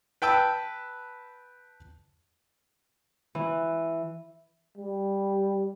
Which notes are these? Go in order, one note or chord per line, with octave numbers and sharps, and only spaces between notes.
B4 G5 A5 E6
E3
G3